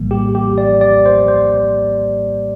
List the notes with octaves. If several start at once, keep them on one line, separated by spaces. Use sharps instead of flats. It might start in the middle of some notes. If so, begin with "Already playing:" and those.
Already playing: A#1 A2 E3 G3 A#3
G4
G4
D5
D5
C5
C5